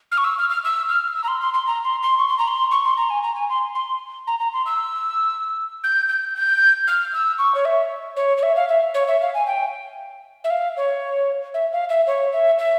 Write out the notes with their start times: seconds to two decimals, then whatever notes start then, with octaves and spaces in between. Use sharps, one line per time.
0.12 F6
0.18 C#6
0.24 E6
0.38 F6
0.50 F6
0.64 E6
0.89 F6
1.15 E6
1.24 A#5
1.28 C6
1.41 C6
1.54 C6
1.67 A#5
1.84 C6
2.03 C6
2.19 C#6
2.28 C6
2.38 A#5
2.48 C6
2.71 C#6
2.85 C6
2.98 A#5
3.10 G#5
3.23 A#5
3.36 G#5
3.50 C6
3.75 C6
4.27 A#5
4.40 A#5
4.53 C6
4.66 E6
5.84 G6
6.09 G6
6.35 G6
6.87 F6
7.14 E6
7.38 C#6
7.55 C#5
7.65 E5
8.16 C#5
8.38 C#5
8.43 E5
8.56 F5
8.69 E5
8.94 C#5
9.08 E5
9.21 F5
9.34 G#5
9.47 G5
10.44 E5
10.50 F5
10.77 C#5
11.54 E5
11.72 F5
11.89 E5
12.07 C#5
12.33 E5
12.59 E5